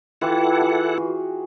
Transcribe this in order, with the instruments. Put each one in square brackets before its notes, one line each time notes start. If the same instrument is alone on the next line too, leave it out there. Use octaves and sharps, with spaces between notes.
[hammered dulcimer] E3 F4 G4 [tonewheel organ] E4 A4 F#5
[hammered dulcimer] G#4
F#4